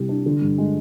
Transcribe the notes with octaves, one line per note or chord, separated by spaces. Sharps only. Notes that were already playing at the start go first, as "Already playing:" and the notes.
Already playing: C2 C3 G3
D4
D3
G2
G#3